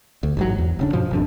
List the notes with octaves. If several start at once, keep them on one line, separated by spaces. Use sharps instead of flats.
D2
A1 G#2 F#3
E2
E1 C#3 D4
G2 B2 F3
G#1 F2 D4